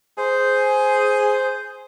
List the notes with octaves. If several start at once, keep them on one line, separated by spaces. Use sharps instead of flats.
G#4 C5